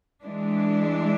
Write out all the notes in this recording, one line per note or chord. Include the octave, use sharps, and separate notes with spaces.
E3 G#3 D4